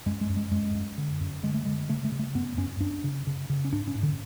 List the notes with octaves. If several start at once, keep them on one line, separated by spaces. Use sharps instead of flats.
F#2 G#3
G#3
F#2
G#3
F#2 G#3
F#2
D3
F#2
D3 G#3
A3
D3 G#3
C#3 A3
A3
C#3
A3
F#2 B3
F#2 C#4
F#2 D4
C#3
C#3
C#3
C#4
G#2 D4
C#4
G#2
D3